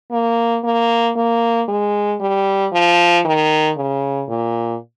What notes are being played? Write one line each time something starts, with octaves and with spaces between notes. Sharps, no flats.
A#3
A#3
A#3
G#3
G3
F3
D#3
C#3
A#2